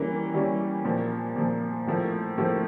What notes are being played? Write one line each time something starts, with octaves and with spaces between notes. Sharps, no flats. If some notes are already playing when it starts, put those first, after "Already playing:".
Already playing: E3 G3 A#3 C#4
E3 G3 A#3 C#4
A#2 F3 A#3
A#2 F3 A#3
A2 F3 A#3
A2 F3 A#3